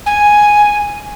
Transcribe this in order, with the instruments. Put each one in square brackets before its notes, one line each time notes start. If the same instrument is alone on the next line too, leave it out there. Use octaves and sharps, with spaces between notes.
[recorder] G#5